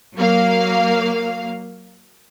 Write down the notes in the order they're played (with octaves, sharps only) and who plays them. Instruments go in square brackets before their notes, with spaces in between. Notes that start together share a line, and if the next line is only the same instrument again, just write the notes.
[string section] F#3 A#3 F5